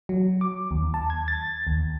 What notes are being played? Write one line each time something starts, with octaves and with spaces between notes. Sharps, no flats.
F#3
D6
D#2
A5
G#6
A6
D#2